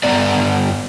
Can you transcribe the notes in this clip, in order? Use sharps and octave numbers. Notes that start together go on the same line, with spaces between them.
G2 B3 D5